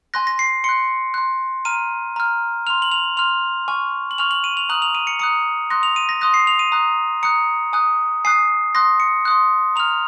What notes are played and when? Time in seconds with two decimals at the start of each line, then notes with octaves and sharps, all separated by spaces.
0.14 G#5 C6 F#6 A#6
0.27 A#6
0.39 C7
0.64 C6 F#6 C#7
1.14 C6 F#6
1.65 A#5 F6 D#7
2.16 A#5 F6
2.67 F6 F7
2.70 C6
2.82 F#7
2.92 F7
3.17 C6 F6 F7
3.68 G#5 C#6 F6
4.11 F#7
4.18 G#5 C#6 F6 F7
4.31 F#7
4.44 D#7
4.57 F7
4.69 A#5 D#6 F#6 F#7
4.82 F7
4.95 D#7
5.07 C#7
5.19 A#5 D#6 F#6 C#7
5.70 C6 D#6 F#6 A#6
5.83 F7
5.96 D#7
6.09 A#6
6.21 C6 D#6 F#6 A#6
6.34 C7
6.47 F7
6.59 D#7
6.72 A#5 D#6 F#6
7.23 A#5 D#6 F#6 C#7
7.73 G#5 D#6 F#6
8.25 G#5 D#6 F#6 C7
8.75 C6 D#6 F#6 A#6
9.00 C#7
9.25 C6 D#6 F#6
9.76 A#5 F6 F7